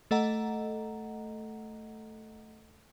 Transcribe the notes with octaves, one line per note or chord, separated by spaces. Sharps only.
A3 A4 D#5 F#5 A#5